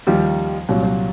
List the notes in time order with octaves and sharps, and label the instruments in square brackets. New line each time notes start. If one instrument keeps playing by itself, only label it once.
[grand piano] D#2 D#3 G3 [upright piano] F3
[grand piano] C2 A#2 G3 [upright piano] F#3
[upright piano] F#3